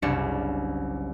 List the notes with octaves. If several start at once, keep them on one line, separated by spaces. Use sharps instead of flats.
F#1 C2 C#4 D4 C#7